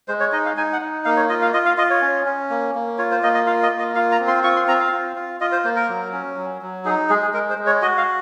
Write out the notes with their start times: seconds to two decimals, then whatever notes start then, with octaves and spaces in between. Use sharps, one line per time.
0.08 G#3 C5
0.20 C#5
0.32 D#4 D#5
0.45 F5
0.57 D#4 G#5
0.73 F#5
0.81 D#4
1.05 A#3 F5
1.17 C#5
1.29 F4 D#5
1.42 F5
1.53 F4 D#5
1.66 F5
1.77 F4 D#5
1.90 C#5
2.02 C#4
2.25 C#4
2.50 A#3
2.75 A#3
2.98 F4 C#5
3.11 C5
3.23 A#3 D#5
3.34 D#5
3.46 F4 F5
3.63 D#5
3.71 A#3
3.79 D#5
3.95 F4 F5
4.12 A#5
4.20 C4
4.27 C6
4.43 F4 C#6
4.56 C6
4.68 C4 A#5
4.80 F5
4.92 F4
5.16 F4
5.41 F4 D#5
5.52 C5
5.64 A#3 C5
5.76 A#4
5.89 F#3
6.13 C#4
6.37 F#3
6.62 F#3
6.85 D#4 G#4
7.09 G#3 G#4
7.22 G#4
7.33 G#3 A#4
7.50 C5
7.58 G#3
7.66 C#5
7.81 F#4 D#5
7.98 F5